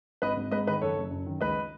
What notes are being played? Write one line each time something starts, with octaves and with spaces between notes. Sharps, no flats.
G#1 B4 D#5
G#1
G#2 B4 D#5
D#3 B4 D#5
F#1 A4 C#5
F#1
F#2
D#3
C#2 B4 D#5